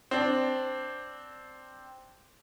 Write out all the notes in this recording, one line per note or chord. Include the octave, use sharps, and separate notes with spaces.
C4 D4